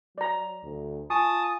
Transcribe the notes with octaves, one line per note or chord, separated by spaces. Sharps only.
F#3 D5 A#5
D2
F4 G#5 A5 C#6 D#6